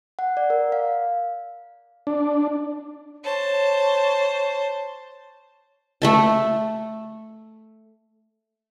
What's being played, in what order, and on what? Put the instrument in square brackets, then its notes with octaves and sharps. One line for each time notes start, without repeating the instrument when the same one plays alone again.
[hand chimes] F#5
D5
A#4
F5
[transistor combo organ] D4
[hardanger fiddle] C5 A5 [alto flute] C#5
[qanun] A3 E5 A5